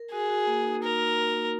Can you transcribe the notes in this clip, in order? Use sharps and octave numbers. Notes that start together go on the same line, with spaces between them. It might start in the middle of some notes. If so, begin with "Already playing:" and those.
Already playing: A#4
F#4 G#4
F#4
A#3
D#4
D#4 A#4
A#3
D#4
A#3